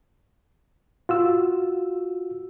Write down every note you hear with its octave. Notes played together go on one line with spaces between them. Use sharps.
F4 F#4 E6